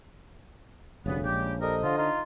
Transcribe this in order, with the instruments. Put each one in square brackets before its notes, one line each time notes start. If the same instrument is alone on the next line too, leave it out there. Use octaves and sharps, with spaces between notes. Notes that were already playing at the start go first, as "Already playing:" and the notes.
[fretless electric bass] F1 D2 [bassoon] C#3 [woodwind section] G3 B3
[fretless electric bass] A#1 [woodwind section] G3 G#3 G4
[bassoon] G3 [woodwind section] A4 C5 D#5 [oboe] A#4
[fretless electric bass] D3 [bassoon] F3 [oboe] F4
[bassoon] D#4 [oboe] F4